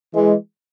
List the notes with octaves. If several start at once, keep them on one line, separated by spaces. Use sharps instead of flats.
E3 G#3